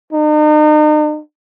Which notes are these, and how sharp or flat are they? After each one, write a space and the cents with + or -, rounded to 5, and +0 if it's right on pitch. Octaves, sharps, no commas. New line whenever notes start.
D#4 -40